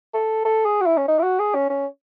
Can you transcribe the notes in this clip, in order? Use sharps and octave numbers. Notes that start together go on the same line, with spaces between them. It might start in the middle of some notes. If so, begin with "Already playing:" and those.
A4
A4
G#4
F#4
E4
C#4
D#4
E4
F#4
G#4
C#4
C#4